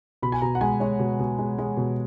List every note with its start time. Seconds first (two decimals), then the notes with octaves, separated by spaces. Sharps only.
0.22 B2 B5
0.32 G#5
0.42 B2 A#5
0.55 F#5
0.61 G#3 G#5
0.80 G#3 C#5
0.99 B2
1.19 B2
1.38 G#3
1.58 G#3
1.77 B2